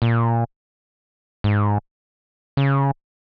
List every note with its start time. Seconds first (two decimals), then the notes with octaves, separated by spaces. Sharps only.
0.02 A#2
1.44 G#2
2.57 C#3